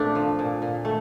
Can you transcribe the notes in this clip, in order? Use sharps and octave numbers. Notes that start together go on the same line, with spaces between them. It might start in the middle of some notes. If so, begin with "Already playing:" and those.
Already playing: A#2 A3 C4 D4
F3
A#2
A#2
A3